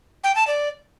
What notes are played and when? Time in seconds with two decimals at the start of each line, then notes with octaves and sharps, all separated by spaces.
0.24 G5
0.36 A5
0.47 D5